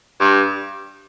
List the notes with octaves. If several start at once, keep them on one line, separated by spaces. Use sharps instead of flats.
G2